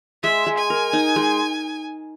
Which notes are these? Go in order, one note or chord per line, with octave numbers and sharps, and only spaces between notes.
G#3 E5
G#3
G#5
A#4
D#4
G#3